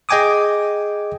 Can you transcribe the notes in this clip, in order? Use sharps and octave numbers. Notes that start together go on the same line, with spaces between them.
G#4 D#5 G5 G#5 D6 D#6